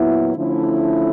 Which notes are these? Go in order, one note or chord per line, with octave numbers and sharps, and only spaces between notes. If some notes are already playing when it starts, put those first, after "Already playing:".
Already playing: A#2 F#3 B3 E4
D3 F3 A3 C#4 E4